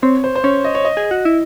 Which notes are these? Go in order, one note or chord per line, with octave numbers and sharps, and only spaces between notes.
C4 C#5
C5
C5
C#4 C#5
D#5
C#5
D#5
G#4
F#4
E4